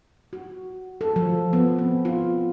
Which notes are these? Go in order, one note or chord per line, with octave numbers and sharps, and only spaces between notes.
F#4
A4
F3
B3
C4
F4